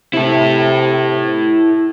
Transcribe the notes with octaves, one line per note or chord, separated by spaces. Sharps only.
C3 E4 A4